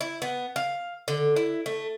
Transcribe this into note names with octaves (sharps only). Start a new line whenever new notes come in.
E4
B3
F5
D3
E4
A3